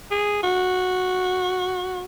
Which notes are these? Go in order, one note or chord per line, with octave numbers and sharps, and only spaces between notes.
G#4
F#4